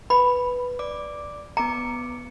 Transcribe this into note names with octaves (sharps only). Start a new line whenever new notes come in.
B4 B5
D5 D6
B3 A#5 D6 C#7